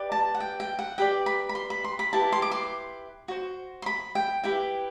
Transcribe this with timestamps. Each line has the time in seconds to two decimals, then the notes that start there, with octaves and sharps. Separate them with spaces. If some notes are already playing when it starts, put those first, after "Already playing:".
Already playing: G4 B4 D5
0.12 A5
0.35 F#5
0.40 G5
0.60 G5
0.79 F#5
0.98 G4 B4 D5 G5
1.26 B5
1.49 B5
1.55 C6
1.70 B5
1.84 C6
1.99 B5
2.13 E4 G4 B4 A5
2.32 C6
2.42 D6
2.51 C6
3.28 F#4 C5
3.82 C6
3.86 B5
4.15 G5
4.44 E4 G4 B4 G5